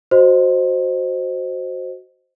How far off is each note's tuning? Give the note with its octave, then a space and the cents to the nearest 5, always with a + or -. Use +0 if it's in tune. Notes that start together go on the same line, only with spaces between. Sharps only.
F#4 +0 C5 +0 D#5 +0